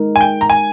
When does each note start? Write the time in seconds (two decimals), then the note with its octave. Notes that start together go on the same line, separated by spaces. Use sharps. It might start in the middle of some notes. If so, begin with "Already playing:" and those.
Already playing: G#3 D#4 A#4
0.16 G#5
0.21 G5
0.41 A#5
0.50 G#5